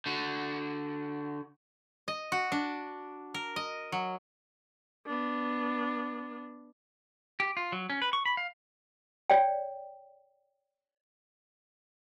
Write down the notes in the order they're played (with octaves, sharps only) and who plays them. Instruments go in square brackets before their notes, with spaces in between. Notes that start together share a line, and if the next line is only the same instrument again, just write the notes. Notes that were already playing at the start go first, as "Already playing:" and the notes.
[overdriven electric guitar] D3 F#4
[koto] D#5
F#4
D4
A#4
D#5
F#3
[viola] B3 D4
[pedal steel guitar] G4
F4
F#3
C#4
B4
C#6
B5
F5
[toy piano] C#5 D5 G5